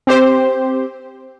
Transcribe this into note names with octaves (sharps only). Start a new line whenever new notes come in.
C4 G4 C5